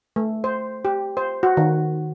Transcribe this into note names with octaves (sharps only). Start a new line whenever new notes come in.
A3
C5
G4
C5
F#4
D#3